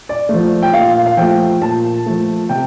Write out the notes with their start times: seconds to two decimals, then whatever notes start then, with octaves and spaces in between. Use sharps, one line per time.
0.09 D5
0.29 F3 A3
0.63 G5
0.73 A#2 F5
1.06 F5
1.17 F3 A3 G5
1.62 A#2 A5
2.06 F3 A3
2.49 C3 G5